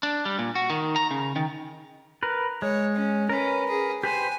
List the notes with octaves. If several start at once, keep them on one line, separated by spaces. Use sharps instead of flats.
D4
G3
A#2
F#4
D#3
A#5
C#3
D#3
A#4 B4
G#3 C#5
C#4
C#4 A#4 B4
G#4
G4 B4 C5 G#5